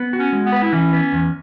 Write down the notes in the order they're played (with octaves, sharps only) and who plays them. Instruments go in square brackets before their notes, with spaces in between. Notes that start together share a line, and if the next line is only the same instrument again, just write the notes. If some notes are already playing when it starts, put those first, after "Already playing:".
Already playing: [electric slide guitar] B3
F#4
[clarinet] C#4
[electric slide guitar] G#3
[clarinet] B3
[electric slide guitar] B4
[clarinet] E4
[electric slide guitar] E3 [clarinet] C#4
[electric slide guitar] B3
E2